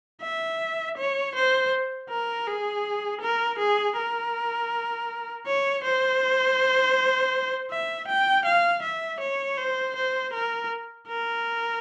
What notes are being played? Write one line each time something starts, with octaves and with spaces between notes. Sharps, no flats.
E5
C#5
C5
A#4
G#4
A#4
G#4
A#4
C#5
C5
E5
G5
F5
E5
C#5
C5
C5
A#4
A#4